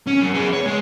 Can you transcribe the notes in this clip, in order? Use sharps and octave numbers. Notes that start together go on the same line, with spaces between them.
C#4
F#2
B3 G#4
C#5
G#3